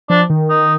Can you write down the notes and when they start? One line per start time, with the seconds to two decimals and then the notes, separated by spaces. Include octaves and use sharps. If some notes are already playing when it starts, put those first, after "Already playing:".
0.10 F3 D4
0.30 D#3
0.50 D#4